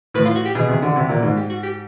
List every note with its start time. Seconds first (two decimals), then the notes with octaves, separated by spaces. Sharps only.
0.14 A2 B4
0.25 F4
0.35 F#4
0.45 G4
0.55 B2 G#4
0.69 C3
0.82 D3
0.96 C3
1.09 A#2
1.23 G#2
1.37 G4
1.50 F#4
1.63 G4